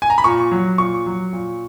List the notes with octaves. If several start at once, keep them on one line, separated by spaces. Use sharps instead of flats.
G#5
A#5
B5
A#2 C#6
F#3
A#2 C#6
F#3
A#2